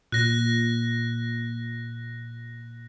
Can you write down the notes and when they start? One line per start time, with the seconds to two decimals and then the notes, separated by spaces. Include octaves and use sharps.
0.12 A#2 F#6 A#6